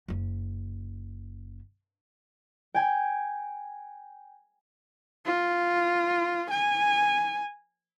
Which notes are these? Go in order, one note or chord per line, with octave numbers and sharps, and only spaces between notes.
F#1 C#4
G5 G#5
F4
G#5